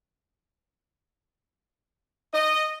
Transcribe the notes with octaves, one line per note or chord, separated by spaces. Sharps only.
D#5